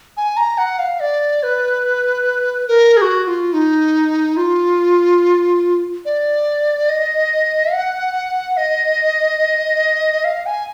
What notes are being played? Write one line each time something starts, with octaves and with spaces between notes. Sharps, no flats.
G#5
A#5
F#5
F5
D5
B4
A#4
G#4
F#4
F#4
F4
D#4
F4
D5
D#5
F#5
D#5
F5
G#5